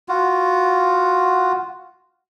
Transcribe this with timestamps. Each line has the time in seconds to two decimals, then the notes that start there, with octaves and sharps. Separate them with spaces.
0.09 F4 F#4